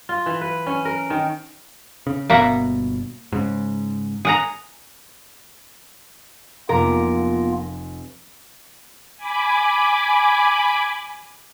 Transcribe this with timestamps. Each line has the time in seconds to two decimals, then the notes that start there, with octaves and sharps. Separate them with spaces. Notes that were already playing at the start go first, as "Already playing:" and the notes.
0.09 F4
0.26 E3
0.41 B4
0.67 C#4
0.85 A#4
1.10 D#3
2.07 C#3
2.30 G1 B2 A#3 E5 F#5
3.32 G#2 C#3
4.25 G#4 F#5 A#5
6.69 F1 A#3 B3 F4 A#4 D6
9.17 G#5 B5 D6